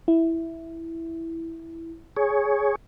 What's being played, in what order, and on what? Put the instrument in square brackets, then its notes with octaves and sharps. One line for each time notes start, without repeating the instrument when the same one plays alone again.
[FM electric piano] E4
[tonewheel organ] G#4 C#5